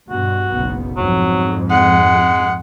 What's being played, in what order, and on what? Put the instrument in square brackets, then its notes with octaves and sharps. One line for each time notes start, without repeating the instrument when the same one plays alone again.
[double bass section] G2 B2 [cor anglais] F#4
[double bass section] F#1 B1 B3
[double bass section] F2 G#2 [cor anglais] F#3
[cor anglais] G#3 [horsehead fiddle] F#5